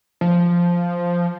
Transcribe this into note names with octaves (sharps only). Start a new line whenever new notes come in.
F3